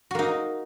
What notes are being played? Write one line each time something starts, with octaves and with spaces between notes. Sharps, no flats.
A#3 D#4 F#4